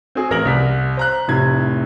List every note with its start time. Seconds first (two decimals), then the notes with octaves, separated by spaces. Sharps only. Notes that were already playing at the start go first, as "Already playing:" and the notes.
0.15 C4 F#4 G#4
0.30 A1 A#4 A#6 F#7
0.45 C2 B6
0.97 C5 A#5 F#6
1.28 F1 A2 C3 G#6